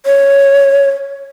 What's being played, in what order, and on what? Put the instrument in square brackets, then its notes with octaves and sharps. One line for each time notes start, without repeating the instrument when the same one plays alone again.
[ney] C#5